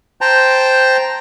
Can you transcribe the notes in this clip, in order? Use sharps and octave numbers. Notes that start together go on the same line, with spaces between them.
C5 G5 A5 A#5